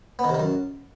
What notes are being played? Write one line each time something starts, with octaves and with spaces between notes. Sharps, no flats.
B3
D#3
C3
D#3
F#2